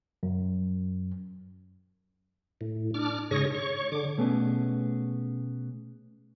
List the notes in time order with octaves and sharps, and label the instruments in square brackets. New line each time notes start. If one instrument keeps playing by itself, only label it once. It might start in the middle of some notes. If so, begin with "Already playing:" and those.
[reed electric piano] F#2
[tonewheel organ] A2
D4 D6 F6
G#2 C#3 G#4 C#5 C#6 A#6
C#5 C#6
D3 D6
[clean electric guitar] B2 A3 B3 C#4 G#4